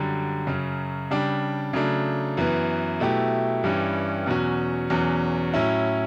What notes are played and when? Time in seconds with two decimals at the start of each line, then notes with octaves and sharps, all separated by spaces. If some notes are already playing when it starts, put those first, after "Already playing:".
Already playing: F#2 D3 G3
0.47 F#2 C#3 F#3
1.11 C#3 G3 D4 G4
1.73 C#3 F#3 A3 D4
2.37 F#2 E3 B3
3.00 B2 F#3 A3 E4 G4
3.64 G2 E3 G3 C#4
4.26 E2 B2 F#3 C#4 F#4
4.90 E2 B2 F#3 C#4 F#4
5.54 A2 F#3 C#4 E4